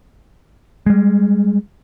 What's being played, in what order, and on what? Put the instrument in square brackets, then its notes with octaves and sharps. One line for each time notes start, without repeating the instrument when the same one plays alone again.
[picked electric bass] G3 G#3